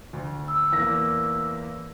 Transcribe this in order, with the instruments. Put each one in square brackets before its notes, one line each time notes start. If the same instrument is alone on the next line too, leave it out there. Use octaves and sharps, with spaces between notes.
[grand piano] D2
[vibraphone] E6
[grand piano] E2 A#3 A#6